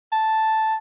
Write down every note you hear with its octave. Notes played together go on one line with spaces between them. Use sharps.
A5